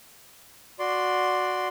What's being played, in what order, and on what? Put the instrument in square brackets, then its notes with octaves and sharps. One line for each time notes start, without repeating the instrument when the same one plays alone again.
[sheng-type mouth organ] F#4 D5 C6